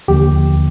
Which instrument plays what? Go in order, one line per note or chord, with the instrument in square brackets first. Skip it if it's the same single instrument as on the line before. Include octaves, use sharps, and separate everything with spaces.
[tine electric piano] D#2 D3 F3 A#3 G4